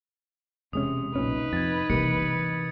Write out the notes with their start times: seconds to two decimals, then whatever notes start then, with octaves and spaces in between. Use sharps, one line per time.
0.73 E1 C3 G#3 C#4 D#6
1.16 B1 A#2 C#4 D#4 B4
1.53 F2 G#6 A6
1.90 C3 E3 G3 A#3 C#7